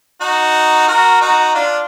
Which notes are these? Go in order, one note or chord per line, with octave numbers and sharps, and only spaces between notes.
D#4 F#4
F#4 A#4
D#4 F#4
D4 F4